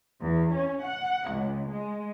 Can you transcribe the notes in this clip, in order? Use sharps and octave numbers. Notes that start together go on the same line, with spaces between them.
E2
C#4
F#5
C#2
G#3